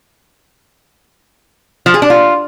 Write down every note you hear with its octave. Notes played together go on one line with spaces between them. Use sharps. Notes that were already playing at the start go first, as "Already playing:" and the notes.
F3
G#4
D4
F4